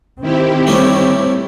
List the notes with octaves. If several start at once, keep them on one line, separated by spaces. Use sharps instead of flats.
D#3 C4 E4 G4
G3 A3 C#4